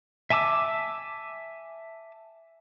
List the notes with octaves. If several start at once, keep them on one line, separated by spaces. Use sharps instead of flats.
E5 G#5 A5 D6 E6